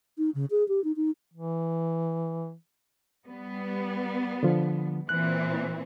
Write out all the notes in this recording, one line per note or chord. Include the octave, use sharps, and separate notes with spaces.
D#4
C#3
G#4
G4
D#4
D#4
E3
G3 B3
D3 F3
A#2 E3 C4 F#6